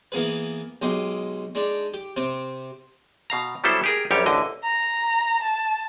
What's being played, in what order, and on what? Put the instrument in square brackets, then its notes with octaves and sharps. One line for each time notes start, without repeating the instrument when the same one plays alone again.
[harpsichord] E3 A#3 B3 G#4 B4
B1 G#3 G4 D#5 C6
G#3 D4 D#4
G4
C3 C4 G4
[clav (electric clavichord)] B2 F5 A#5
F#3 G3 B3 E4 A4 C5
G4 G#4 A#4
A#1 F#2 G3 G4 C#5
A1 D2 D3 D#5
[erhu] A#5
A5